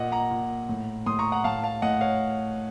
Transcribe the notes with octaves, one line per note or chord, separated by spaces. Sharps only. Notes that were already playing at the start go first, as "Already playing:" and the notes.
Already playing: A#2 D#5 F#5
F#5 A#5
A#2
A2
A2 C6 D#6
A#5 C#6
F#5 A#5
A2 F5 A5
F5 A5
A2 D#5 F#5
C#5 F5